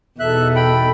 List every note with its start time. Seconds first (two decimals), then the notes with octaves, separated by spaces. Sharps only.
0.20 E2 B2 D#4 A4 E5 F#6
0.56 G5 B5